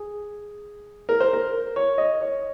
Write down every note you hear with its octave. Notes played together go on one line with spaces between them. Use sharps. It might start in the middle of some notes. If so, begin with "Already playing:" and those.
Already playing: G#4
A#4
C5
A#4
C#5
D#5
C#5